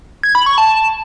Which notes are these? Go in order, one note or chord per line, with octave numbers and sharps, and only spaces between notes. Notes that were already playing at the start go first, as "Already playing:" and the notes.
G#6
B5
C#6
A5